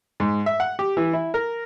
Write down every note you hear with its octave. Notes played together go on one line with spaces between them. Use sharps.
G#2
E5
F#5
G4
E3
E4
A#4